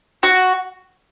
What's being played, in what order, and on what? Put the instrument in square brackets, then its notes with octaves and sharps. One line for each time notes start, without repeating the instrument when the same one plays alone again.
[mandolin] F#4